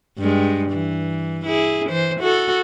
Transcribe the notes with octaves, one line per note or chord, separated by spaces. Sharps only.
G2 G#3
E3
E4 G#4
E3 C5
F#4 A4